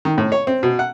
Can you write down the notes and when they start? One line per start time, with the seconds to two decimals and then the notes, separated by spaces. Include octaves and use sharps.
0.05 D#3
0.18 A2
0.32 C#5
0.47 C4
0.63 B2
0.79 F#5